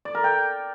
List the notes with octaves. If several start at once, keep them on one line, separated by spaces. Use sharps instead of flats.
D5
A#4
G5